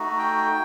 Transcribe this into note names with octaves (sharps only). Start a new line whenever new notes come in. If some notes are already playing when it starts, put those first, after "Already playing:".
Already playing: A3 D#4 F#4
G5